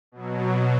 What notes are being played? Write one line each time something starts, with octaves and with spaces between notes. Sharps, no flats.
B2 F#3